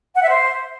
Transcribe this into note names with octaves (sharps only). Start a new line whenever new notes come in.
F#5
E5
C5